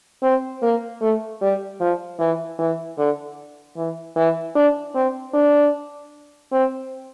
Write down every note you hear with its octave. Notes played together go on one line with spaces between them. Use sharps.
C4
A#3
A3
G3
F3
E3
E3
D3
E3
E3
D4
C4
D4
C4